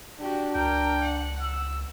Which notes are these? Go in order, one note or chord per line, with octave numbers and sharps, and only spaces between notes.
D4 F#4 G4
C#2 A#4 G5
F#5
E6